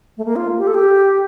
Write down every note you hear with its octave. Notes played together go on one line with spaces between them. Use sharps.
A3
A#3
F4
G4
A4
G4